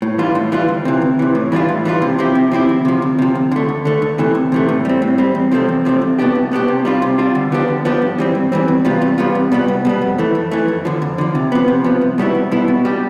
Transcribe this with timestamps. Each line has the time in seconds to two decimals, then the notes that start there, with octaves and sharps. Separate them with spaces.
0.02 A2
0.18 E3 G3 D4 F4
0.35 A2
0.52 E3 G3 D4 F4
0.68 D2
0.85 C3 E3
1.02 D2
1.19 C3 E3
1.35 A2
1.52 E3 G3 D4 F4
1.69 A2
1.85 E3 G3 D4 F4
2.02 C3
2.18 F3 C4 E4 G4
2.35 C3
2.52 F3 C4 E4 G4
2.69 D2
2.85 C3 F3
3.02 D2
3.19 C3 F3
3.35 D2
3.52 D3 A3
3.69 D2
3.85 D3 A3
4.02 D2
4.18 C3 E3 A3
4.35 D2
4.52 C3 E3 A3
4.69 A2
4.85 G3 C4
5.02 A2
5.18 G3 C4
5.35 E2
5.51 C3 F3 A3 C4
5.69 E2
5.85 C3 F3 A3 C4
6.01 C2
6.19 B2 B3 D4 G4
6.35 C2
6.51 B2 B3 D4 G4
6.68 C3
6.85 G3 D4 F4
7.02 C3
7.18 G3 D4 F4
7.35 D3
7.52 F3 B3 D4 G4
7.68 D3
7.85 F3 B3 D4 G4
8.02 G2
8.18 E3 G3 C4
8.35 G2
8.52 E3 G3 C4
8.68 E2
8.85 C3 G3 B3 F4
9.02 E2
9.18 C3 G3 B3 F4
9.35 C2
9.52 B2 G3 B3
9.68 C2
9.85 B2 G3 B3
10.02 F2
10.18 E3 A3
10.35 F2
10.51 E3 A3
10.68 F2
10.85 D3 F3
11.02 F2
11.18 D3 F3
11.35 C3
11.52 F3 B3
11.68 C3
11.84 F3 B3
12.01 C2
12.18 B2 G3 B3 E4
12.35 C2
12.51 B2 G3 B3 E4
12.68 B2
12.85 G3 D4 G4